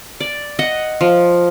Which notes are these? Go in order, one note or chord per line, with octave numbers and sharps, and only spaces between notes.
D5
D#5 F#5
F3